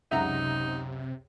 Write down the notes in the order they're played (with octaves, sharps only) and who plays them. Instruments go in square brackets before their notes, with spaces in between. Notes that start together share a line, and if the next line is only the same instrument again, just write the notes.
[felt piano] C#2 F#2 [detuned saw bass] C3 [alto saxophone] D#4 [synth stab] E5 F#5 A#5